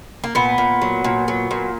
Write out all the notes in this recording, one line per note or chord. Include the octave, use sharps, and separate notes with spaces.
A#3
A#2 B3
A#2
F#3
A#2
F#3
A#2